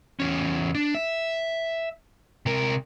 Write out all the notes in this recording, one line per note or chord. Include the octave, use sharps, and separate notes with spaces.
E2 C#4
D4
E5
C3 A#4